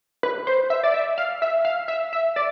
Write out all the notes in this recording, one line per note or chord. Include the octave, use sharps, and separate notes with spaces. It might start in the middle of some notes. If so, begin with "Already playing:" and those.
B4
C5
E5
D5
E5
F5
E5
F5
E5
E5
D5